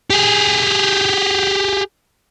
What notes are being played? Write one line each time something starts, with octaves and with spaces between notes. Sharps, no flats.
G4 G#4